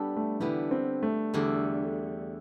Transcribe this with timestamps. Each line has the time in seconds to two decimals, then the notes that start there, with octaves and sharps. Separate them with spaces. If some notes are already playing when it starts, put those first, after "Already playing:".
Already playing: G3 B3 D4 A4
0.16 A3
0.40 D3 E3 G3 B3
0.71 C4
1.03 A3
1.34 E2 D3 G3